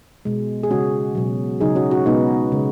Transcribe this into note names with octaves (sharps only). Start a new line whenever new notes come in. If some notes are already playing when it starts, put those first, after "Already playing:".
B2 G#3
G#4
C#3 G#3 C#4 F#4
B2 F#3
C#3 F#3 D#4 G#4
C#4 F#4
C#4 F#4
B2 G#3 B3 D#4
C#3 G#3